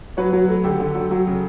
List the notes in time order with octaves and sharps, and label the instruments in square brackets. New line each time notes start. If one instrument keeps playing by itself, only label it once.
[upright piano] F#3 B4 C#5
F#3
A3
D3 G4 A4
D3
F#3
F#3
C#3